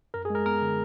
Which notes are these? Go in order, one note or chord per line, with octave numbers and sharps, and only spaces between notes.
F#2 A#4
G#4
G#3 A#4
B3 A#4
D3